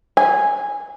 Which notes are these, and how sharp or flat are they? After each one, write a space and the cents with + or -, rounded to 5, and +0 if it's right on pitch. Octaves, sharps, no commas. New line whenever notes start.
G#5 -10